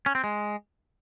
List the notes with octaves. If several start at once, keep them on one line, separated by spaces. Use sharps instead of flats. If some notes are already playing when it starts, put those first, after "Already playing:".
C#4
C4
G#3